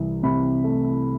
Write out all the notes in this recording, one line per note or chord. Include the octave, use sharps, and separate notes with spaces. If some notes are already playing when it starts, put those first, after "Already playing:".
Already playing: C2 E3
C3 B5
A3